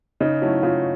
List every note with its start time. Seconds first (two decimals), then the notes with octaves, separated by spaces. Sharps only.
0.20 C#3 D#4
0.42 F#3 A3 C#4 E4
0.63 C#3 F4